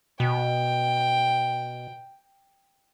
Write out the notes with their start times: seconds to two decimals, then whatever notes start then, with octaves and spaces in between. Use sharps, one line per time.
0.20 B2 G5